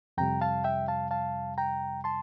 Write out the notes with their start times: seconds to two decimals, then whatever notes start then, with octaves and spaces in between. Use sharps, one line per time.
0.17 F2 C3 G3 G5 A#5
0.41 F5 A5
0.64 E5 G5
0.88 F5 A5
1.11 F5 A5
1.58 G5 A#5
2.04 A5 C6